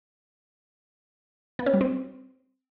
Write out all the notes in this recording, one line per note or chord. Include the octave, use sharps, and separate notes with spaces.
B3
C#4
G3
C4